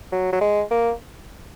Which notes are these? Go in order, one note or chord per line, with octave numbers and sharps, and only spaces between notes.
F#3
F#3
G#3
A#3